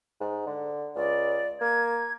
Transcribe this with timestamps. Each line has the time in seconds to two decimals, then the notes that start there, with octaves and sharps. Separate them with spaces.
0.20 G#2
0.47 D3
0.95 C#2 D5
1.61 A#3 G#6